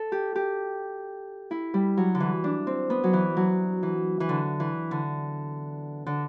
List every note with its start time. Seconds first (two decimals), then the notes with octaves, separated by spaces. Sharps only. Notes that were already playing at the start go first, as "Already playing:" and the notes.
Already playing: A4
0.12 G4
0.36 G4
1.51 E4
1.74 G3
1.97 F#3
2.15 D3
2.20 E3
2.44 D4
2.67 C4
2.90 B3
3.04 F#3
3.13 E3
3.37 F#3
3.83 E3
4.20 E3
4.29 D3
4.60 E3
4.91 D3
6.06 D3